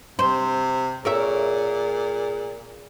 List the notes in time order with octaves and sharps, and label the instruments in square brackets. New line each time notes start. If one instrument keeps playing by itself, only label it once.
[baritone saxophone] C3 [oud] C5
[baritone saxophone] A#2 [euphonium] G#4 [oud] A#4 C#5 E5